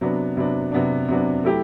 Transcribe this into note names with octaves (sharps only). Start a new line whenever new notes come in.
C3 F#3 B3 D4
C3 F#3 B3 D4
C3 F#3 B3 D4
C3 F#3 B3 D4
F#3 A3 E4 G4